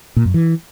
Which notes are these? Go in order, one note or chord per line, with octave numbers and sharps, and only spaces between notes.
A#2
F#2
E3